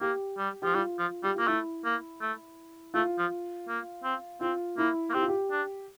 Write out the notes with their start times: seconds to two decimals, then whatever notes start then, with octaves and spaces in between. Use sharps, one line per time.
0.01 A#3 G4
0.38 G3
0.62 F3 G4
0.74 G3 F4
0.99 F3
1.23 G3 G4
1.36 A#3 F4
1.47 A3 E4
1.85 A#3
2.21 A3
2.94 A3 F4
3.18 F3
3.68 A#3
4.04 C4
4.41 C4 F4
4.78 A#3 E4
5.10 A#3
5.14 C4 G4
5.22 F4
5.28 G4
5.51 D4